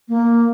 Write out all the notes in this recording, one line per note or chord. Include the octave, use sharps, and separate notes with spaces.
A#3